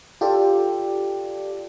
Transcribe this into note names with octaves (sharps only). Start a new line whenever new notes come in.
F4 G4 A4 D5